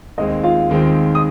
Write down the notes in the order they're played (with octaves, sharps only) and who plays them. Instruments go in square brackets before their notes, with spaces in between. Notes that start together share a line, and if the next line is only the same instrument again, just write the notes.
[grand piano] D#2 D#3 G#3 C4 [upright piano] D#5
[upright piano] F4 F5
[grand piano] D#2 D#3 G#3 C4
[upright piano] D#6